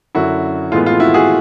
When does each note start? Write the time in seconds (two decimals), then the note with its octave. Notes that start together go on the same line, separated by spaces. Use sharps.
0.15 F#2 D3 F#3 E4 F#4
0.72 A2 E3 G#3 B3 F4
0.86 F4
1.00 E4 F#4
1.14 F#4 G#4